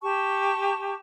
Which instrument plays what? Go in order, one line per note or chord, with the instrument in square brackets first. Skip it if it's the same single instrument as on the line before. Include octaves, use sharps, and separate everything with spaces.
[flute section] G4 A5 C#6